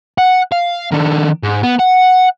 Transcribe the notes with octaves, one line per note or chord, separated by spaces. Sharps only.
F#5
F5
D#3 D4
G#2
B3
F#5